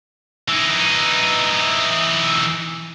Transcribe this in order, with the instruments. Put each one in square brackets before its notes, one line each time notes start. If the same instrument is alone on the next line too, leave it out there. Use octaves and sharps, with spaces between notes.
[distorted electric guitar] E3 D#4